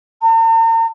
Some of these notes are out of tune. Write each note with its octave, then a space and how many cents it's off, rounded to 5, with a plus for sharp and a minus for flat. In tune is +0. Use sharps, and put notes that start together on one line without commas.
A#5 -45